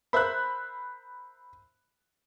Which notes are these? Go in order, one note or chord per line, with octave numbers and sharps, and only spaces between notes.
A#4 C5 E5 B5 F#6